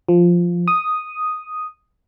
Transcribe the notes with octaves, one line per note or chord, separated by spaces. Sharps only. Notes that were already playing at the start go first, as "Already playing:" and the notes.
F3
D#6